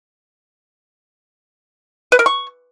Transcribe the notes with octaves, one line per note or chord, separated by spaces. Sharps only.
B4
A#4
C#6